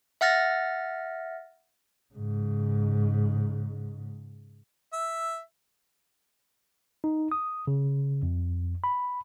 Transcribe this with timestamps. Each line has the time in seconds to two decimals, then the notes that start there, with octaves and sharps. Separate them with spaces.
0.21 E5 F#5 F6 A6 A#6
2.15 G#2 C#3
4.93 E5
7.04 D#4
7.32 D#6
7.67 C#3
8.23 F2
8.84 B5